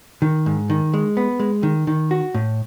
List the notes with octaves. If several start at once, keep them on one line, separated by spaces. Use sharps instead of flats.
D#3
G#2
D#3
G#3
B3
G#3
D#3
D#3
F#4
A2